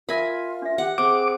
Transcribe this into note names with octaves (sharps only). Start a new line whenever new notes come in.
F4 A#4 E5 G#5 B5 E6
D4 E5
G4 F#5
C4 G#4 D6